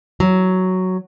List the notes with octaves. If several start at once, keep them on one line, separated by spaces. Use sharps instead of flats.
F#3